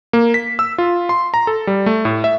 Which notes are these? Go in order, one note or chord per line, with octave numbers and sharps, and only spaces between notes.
A#3
B6
E6
F4
C6
A#5
A4
G3
A3
A2
E5